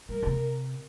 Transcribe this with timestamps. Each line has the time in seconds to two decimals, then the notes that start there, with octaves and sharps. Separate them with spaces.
0.09 G3 A#4
0.22 D3
0.26 C3